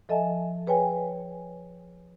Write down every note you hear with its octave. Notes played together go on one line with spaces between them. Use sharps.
F3 A4 D#5 E5 G#5 A5
G#4 B4 C#5 G5 G#5